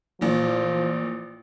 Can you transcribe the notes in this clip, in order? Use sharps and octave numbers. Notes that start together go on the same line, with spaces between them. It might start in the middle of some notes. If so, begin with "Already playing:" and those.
A1 A#2 F3